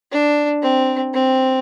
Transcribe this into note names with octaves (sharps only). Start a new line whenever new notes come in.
D4
C4
C4